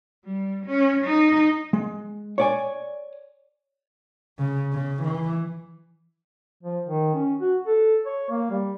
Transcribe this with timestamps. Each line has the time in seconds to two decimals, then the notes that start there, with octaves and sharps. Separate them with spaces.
0.25 G3
0.66 C#4
1.05 D#4
1.73 G#3
2.38 C#5 D5 G#5
4.39 C#3
4.73 C#3
5.03 E3
6.63 F3
6.86 D#3
7.15 C#4
7.40 F#4
7.66 A4
8.06 C#5
8.30 A#3
8.50 G3